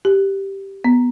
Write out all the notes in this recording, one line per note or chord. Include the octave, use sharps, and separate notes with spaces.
G4
B3